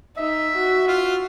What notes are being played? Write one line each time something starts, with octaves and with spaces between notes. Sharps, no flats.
D#4 E5
F#4
F4